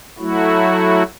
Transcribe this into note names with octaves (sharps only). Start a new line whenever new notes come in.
F#3 A3 E4 F#4